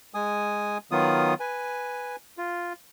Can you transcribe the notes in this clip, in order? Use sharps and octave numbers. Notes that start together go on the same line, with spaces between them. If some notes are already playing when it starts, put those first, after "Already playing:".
G#3 G#5 D#6
D#3 F#3 B3 F4 D#6
B4 G#5
F4